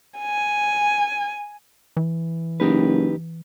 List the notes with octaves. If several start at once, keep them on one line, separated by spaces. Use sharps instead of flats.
G#5
E3
F#1 D#4 G4 B4